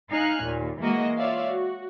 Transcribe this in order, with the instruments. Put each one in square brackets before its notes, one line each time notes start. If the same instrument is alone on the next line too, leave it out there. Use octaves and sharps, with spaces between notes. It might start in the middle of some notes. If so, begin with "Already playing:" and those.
[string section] D#4 F5 G#5 F6 F#6
D#2 A#2
E3 G#3 A#3 F#4 D#5
F4 C#5 D5 E5 F5
F#4